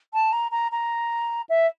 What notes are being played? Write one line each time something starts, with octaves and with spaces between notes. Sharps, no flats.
A5
A#5
A#5
A#5
E5